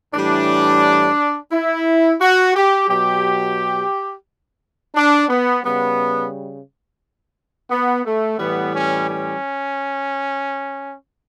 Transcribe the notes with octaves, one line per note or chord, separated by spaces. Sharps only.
A2 E3 G3 D4
E4
F#4
G4
B2 F#3 G4
D4
B3
C#3 G3 B3
B3
A3
A2 E3 G3 B3
C#4
C#4